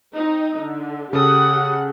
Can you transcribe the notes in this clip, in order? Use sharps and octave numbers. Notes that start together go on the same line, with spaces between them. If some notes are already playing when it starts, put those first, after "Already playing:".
C4 D#4
D3
C#3 G4 A4 F#5 D#6